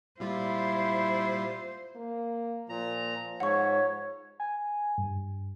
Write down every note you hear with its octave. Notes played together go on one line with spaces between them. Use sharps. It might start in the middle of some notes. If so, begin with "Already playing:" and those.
A#2 G3 E4 F4 C5
A#3
A#2 F3 A#5
G#2 C#5 F#5 C#6
G#5
G2